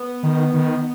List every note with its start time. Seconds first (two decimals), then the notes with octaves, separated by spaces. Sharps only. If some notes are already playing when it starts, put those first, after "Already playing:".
Already playing: B3
0.23 D#3
0.54 D#3